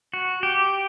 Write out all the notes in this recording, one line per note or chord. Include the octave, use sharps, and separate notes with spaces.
F#4
G4